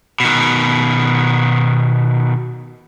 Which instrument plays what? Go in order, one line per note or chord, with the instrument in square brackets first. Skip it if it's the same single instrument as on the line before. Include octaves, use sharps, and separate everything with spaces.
[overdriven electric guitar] B2 D#3